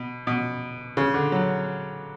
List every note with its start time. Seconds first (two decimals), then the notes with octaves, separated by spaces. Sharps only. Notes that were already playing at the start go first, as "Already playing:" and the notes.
Already playing: B2
0.27 B2
0.97 C#3
1.14 D3
1.32 F#3